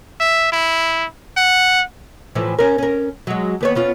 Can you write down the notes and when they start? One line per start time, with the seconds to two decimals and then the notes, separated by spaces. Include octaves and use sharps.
0.20 E5
0.52 E4
1.37 F#5
2.35 A2 E3 F3
2.59 C#4 A#4
2.78 C#4 A#4
3.27 F#3 G#3
3.61 D#2 B3 C#5
3.75 B3 C#4 F4